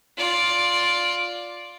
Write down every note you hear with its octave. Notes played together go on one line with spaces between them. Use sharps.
F4 D5